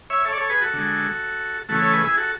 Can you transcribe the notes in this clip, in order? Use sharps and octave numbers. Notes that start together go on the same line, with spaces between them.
C#5 E5
A4 C#5
D5
A4 C#5
G#4 B4
F#4 A4
D3 G#3
C#3 E3 A3 F#4 A4
A4 C#5
G#4 B4
E4 G#4
F#4 A4